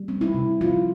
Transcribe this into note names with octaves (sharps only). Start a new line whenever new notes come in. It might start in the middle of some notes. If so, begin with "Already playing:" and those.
Already playing: G3
C4
E4
C3
F3 F4